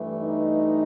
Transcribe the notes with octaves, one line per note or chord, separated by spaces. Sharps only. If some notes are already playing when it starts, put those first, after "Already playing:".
Already playing: G2 E3 A3
D#4 D#5